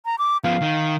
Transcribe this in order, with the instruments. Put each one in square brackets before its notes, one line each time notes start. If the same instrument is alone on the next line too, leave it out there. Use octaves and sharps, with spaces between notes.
[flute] A#5
D6
[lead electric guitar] F3 B3 [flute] F5
[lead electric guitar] D#3